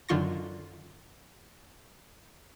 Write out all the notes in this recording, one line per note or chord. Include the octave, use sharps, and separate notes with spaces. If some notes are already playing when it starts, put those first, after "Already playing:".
F#2 D3 D#3 F4 C#6 A#6